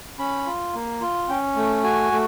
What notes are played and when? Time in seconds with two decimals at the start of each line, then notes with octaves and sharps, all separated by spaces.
0.19 C#4 B5
0.47 F4
0.74 A#3
1.01 F4
1.29 C#4 G5
1.56 A3
1.83 F#4 G#5
2.12 A3